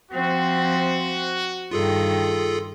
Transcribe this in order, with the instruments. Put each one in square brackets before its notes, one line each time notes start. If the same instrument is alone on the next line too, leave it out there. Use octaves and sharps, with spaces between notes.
[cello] F3 C4 [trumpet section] F#4
[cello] G2 D#3 [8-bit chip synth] F4 G#4 A4